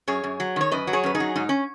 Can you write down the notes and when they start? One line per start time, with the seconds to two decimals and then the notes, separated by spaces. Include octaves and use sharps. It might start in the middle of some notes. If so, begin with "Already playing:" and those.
0.07 F#2 G#4 C#5
0.24 F#2
0.40 F#3
0.56 D#3 C#5
0.72 F#2 B4 D#5
0.87 F#3
0.93 G#4 C#5
1.03 F#2 B4
1.15 D#4 G#4
1.20 F#3
1.36 G#2 D#4
1.49 C#4